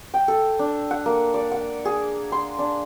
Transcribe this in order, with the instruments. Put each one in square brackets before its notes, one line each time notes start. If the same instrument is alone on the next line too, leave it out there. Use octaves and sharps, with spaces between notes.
[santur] G5
A4
D4
F#5
A#3
D5
F#5
G#4
C6
D4